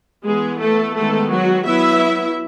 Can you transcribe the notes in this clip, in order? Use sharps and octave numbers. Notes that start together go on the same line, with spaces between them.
E3 G#3 B3 G#4
A3 A4
D#3 G#3 A3 B3 A4
F#3 F#4
F#3 B3 E4 E5